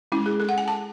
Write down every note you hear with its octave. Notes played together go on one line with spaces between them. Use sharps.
G#3 C#4 E4
G#4
A4
F#5
G#5
A5